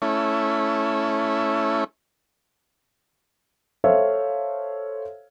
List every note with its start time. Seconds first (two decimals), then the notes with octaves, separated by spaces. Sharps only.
0.02 A3 C#4 E4
3.84 A4 C5 C#5 E5 F5